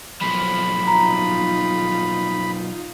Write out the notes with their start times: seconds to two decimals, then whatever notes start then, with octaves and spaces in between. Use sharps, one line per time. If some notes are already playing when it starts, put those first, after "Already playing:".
0.21 B1 F3 B5
0.87 D#4 F4 A#5